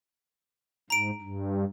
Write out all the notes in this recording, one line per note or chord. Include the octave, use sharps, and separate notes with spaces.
G#2 A#5 D7
G2